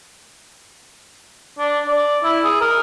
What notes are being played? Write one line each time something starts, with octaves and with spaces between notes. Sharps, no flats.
D4
D5
E4
G#4
A#4